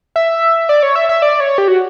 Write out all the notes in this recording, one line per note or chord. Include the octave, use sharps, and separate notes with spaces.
E5
D5
C#5
E5
E5
D5
C#5
G4
F#4